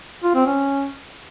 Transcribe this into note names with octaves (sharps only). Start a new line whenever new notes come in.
F4
C4
C#4